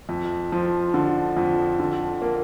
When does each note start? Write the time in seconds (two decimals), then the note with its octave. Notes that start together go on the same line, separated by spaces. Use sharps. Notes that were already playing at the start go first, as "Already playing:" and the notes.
0.09 F2
0.52 F3
0.94 D3
1.37 F2
1.80 D3
2.22 A#3